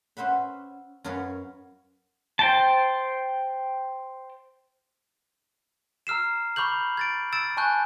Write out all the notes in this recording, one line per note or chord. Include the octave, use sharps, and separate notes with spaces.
C#4 C5 E5 F#5 B5
F#2 C#4 A#4 C#5 F5 B5
C5 G5 A5
A#5 E6 F6 C7 E7
B5 C#6 D6 G6 F#7
G#6 A6 D7
E6 A6 D7 E7
G#5 A5 C#6 F#6 G6